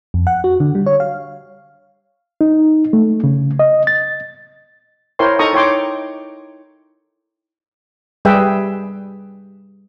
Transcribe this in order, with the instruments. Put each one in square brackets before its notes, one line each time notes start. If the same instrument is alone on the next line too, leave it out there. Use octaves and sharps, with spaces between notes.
[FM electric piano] F2
F#5
F#4
D3
G3
C#5
F5
[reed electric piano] D#4
A3
C#3
D#5
A6
[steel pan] E4 A#4 C5 C#5 G5 C6
D#4 A4 A#5 C#6 D#6
E4 C#5 G5 C6 D6
G3 G4 G#4 B4 E5 G5